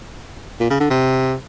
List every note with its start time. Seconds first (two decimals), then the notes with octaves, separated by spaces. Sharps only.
0.60 A#2
0.70 C#3
0.80 D3
0.90 C3